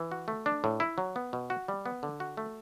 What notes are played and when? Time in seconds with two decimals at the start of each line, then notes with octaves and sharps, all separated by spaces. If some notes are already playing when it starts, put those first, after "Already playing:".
Already playing: E3
0.12 F#4
0.28 A3
0.46 D4
0.64 A2
0.80 E4
0.98 F#3
1.16 B3
1.33 B2
1.50 F#4
1.68 G3
1.86 B3
2.03 D3
2.20 F#4
2.37 A3